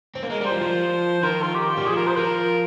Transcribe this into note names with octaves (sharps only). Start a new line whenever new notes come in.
C4
A#3
G#3 A#4
G3
C5
F3
F3
D#3 A#4
F4
G4
F4
G3
F3 G#4
A#4
C5
F3 A#4